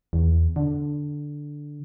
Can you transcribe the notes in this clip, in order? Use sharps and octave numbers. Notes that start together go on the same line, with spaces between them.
E2
D3